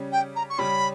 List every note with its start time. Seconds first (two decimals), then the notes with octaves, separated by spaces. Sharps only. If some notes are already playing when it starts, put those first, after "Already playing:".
Already playing: C#3 G3 C#4
0.12 G5
0.35 A#5
0.49 C#6
0.58 C#3 G3 C#4 B5